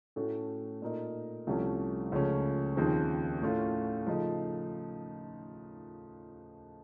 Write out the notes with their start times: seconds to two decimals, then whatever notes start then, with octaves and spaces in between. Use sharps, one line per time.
0.16 A2 A3 C#4 F#4 A4
0.82 A#2 A3 D#4 A#4
1.47 C2 C3 F3 A3 C#4
2.12 C#2 C#3 F3 A3 C#4
2.77 D#2 C#3 F3 C4
3.41 A2 A3 C#4 F4
4.06 C#3 F3 A3 D#4